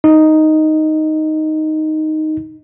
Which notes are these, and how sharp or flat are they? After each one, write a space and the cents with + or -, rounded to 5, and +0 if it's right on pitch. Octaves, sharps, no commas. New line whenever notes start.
D#4 +0